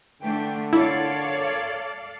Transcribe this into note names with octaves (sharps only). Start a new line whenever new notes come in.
D3 E3 A3 D4 G5
A#3 E4 F4 A4 C#5 D5 F5